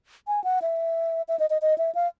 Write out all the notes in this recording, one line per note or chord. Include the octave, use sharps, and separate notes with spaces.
G#5
F#5
E5
E5
D#5
D#5
D#5
E5
F5